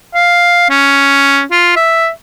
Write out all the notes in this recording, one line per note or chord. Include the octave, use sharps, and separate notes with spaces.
F5
C#4
F4
E5